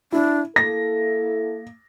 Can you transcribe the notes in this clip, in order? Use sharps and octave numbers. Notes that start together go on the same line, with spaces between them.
D4 E4
A#3 E4 A4 A#6